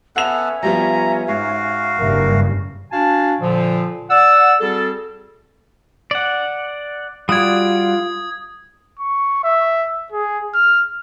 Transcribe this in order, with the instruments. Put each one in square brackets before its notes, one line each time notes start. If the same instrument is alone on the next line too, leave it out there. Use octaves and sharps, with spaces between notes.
[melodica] B3 A4 [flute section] C#4 E5 [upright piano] F#5 F7
[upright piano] F3 G3 B3 [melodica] A#5
[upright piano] G#2 [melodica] F#4 F5
[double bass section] F#1 G2 C#3 [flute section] A#4 E5
[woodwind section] D4 F#4 F5 G#5 A5
A#2 D3 F3
D5 F#5 E6
G3 C4 F#4 G#4 A4
[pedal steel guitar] D5 F#5
[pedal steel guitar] G3 F#4 D5 [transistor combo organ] F4 [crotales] D#6 G#6
[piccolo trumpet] C#6
E5
G#4
F6